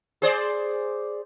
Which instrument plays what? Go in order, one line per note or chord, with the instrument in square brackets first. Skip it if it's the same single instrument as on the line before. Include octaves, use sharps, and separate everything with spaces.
[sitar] G#4 C5 D5